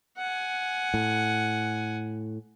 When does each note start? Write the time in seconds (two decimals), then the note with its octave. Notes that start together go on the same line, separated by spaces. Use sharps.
0.18 F#5 G#5
0.94 A2